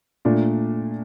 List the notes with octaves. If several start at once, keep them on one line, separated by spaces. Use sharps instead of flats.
A#2 A3 D4